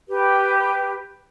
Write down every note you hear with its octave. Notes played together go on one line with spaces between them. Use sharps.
G4 B4